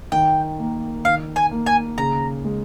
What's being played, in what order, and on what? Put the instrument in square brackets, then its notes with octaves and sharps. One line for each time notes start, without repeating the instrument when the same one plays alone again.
[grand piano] D#3 [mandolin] G5
[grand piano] A#3
[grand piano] D#3 [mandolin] F5
[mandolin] G#5
[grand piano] A#3
[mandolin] G#5
[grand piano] C#3 [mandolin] A#5
[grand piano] G#3